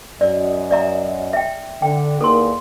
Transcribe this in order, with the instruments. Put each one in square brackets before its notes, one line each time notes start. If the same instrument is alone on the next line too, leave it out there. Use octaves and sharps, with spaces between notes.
[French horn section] F#2 D#5 [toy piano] D5
[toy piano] D5 E5 A#5
E5 G5
[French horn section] D3 [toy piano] G5
[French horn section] E2 D#3 A#3 [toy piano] A4 A#4 C6